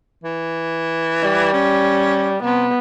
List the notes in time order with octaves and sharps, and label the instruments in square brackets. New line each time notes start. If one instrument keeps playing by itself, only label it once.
[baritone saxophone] E3
[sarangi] G3
[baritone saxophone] C#4
[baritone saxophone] C3 [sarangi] B3